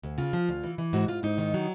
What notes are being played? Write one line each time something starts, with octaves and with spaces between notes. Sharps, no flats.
D2
C#3 F4
F3
D2
E3
E3
G#2 F#4
G#2 F4
G#2 D#4
D#3
F#3